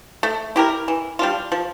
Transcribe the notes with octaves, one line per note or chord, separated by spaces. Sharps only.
A3
E4 G4 A#4
E3
G3 D4 F4
F3